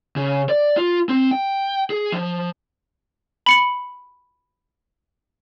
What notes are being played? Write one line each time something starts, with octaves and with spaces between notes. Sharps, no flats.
C#3
D5
F4
C4
G5
G#4
F3
B5 C#7 F#7